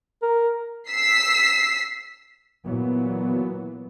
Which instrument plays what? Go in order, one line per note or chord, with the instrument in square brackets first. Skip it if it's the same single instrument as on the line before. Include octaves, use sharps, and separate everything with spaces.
[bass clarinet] A#4
[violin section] E6 B6 C7
[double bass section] A#2 E3 F#3 B3